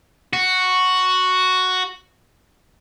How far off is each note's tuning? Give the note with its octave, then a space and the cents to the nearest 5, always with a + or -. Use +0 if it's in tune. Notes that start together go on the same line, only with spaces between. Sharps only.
F#4 +0